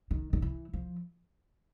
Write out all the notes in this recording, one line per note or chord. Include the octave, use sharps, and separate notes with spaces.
D#3
D#3
E3
F3